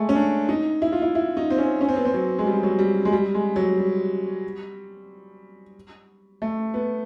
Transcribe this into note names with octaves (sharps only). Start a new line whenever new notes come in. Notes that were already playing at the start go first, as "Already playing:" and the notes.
Already playing: G#3 A3
C#4
D4
D#4
E4
F4
E4
E4
D#4
C4
C#4
C#4
C4
B3
C4
F#3
G#3
G3
F#3
G3
G#3
G3
G#3
F#3
G3
A3
B3